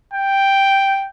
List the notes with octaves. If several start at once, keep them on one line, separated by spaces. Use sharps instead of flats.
G5